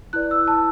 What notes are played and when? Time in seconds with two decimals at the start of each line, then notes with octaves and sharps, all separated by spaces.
0.13 E4 B4 D5 F#6
0.31 E6
0.48 A5